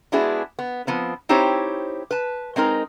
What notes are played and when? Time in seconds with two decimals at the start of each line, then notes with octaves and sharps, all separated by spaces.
0.12 G#3 B3 D4 E4 F#4 G#4
0.59 B3
0.87 F3 B3 C4
1.29 C4 D#4 E4 G4 C5 C#5
2.11 B4 A5
2.56 G#3 C4 D#4 A#4